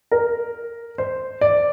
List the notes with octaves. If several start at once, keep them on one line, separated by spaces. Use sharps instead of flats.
A#4
C5
D5